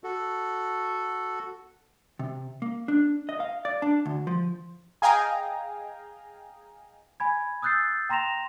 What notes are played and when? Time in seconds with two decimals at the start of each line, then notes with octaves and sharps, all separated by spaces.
0.04 F#4 A4
2.19 C3
2.62 A#3
2.88 D4
3.29 D#5
3.40 F5
3.65 D5
3.82 D4
4.06 D2
4.27 F3
5.02 G#4 D#5 F5 G5 G#5 A#5
7.20 G#5 B5 G#6
7.62 D#6 E6 F#6 G6 A6 C7
8.09 G5 A#5 C6 A#6 E7 F7